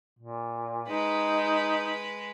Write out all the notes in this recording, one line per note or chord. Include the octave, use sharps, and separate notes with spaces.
A#2
G#3 D#4 B4